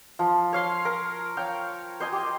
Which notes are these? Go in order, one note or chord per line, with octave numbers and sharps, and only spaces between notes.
F3
C#5 F5 C6
A#4
C#5 F5 G5
C5 D#5 G#5
G4